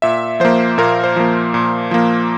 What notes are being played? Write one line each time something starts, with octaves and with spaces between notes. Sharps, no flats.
A#2 E5
F3 A#3 C5
A#2 A#4
C5
F3 A#3
A#2
F3 A#3